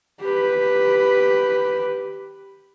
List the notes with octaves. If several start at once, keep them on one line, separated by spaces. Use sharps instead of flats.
G4 B4